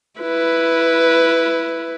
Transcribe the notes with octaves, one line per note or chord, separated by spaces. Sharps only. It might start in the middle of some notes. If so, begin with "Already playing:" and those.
E4 B4